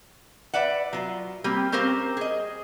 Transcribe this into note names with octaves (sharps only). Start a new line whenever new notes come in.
B4 D5 E5 F#5
F#3 F4
G3 A#3 C4 G4
C4 C#4 G4 A#4 C5 F5
G#4 D#5